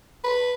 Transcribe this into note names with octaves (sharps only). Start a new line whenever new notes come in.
B4